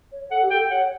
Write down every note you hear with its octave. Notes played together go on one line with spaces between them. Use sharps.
C#5
A4 F#5
G4
A4 G5
C#5 F#5